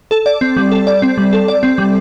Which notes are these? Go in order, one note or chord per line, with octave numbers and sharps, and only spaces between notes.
A4
D5
C4
G3
A4
D5
C4
G3
A4
D5
C4
G3